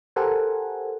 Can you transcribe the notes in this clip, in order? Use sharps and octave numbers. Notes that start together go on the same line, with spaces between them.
G4 A4 A#4 C5 F#5 G#5